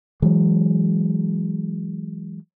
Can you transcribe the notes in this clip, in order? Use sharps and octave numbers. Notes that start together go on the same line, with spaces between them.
E3 F#3 G#3